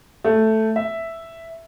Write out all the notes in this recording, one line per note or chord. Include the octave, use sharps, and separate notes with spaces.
A3
E5